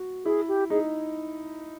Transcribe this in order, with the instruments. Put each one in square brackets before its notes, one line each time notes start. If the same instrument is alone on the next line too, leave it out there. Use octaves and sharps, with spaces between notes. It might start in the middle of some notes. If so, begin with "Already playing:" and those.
Already playing: [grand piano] F#4
[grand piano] E4 [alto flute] G#4
[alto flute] G4
[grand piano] D#4 [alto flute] G#4